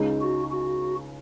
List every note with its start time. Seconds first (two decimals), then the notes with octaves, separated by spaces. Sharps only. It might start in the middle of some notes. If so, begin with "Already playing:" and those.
Already playing: C#2 C#3 G#3 D#4
0.21 F#4
0.51 F#4